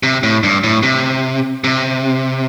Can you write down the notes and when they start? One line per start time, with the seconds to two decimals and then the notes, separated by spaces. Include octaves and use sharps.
0.03 C3
0.23 A2
0.43 G2
0.64 A2
0.83 C3
1.64 C3